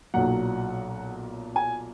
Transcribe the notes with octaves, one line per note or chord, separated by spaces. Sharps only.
B1 A#2 F#3 F#5
G#5